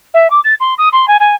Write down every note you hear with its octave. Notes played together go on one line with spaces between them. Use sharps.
E5
D6
A6
C6
D#6
C6
G#5
G#5